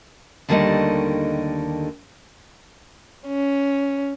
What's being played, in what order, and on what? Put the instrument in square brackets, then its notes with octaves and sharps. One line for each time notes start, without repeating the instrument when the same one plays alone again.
[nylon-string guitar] D#2 D3 D#3 G3 A3 D#5
[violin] C#4